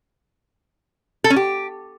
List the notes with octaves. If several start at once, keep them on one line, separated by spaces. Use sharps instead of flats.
A4
C#4
G4